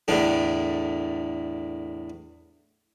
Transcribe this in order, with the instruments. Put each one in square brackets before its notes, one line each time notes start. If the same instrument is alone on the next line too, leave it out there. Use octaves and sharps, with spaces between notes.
[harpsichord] E2 A2 D3 D4